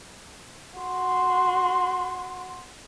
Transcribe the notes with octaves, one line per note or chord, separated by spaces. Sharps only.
F#4 C6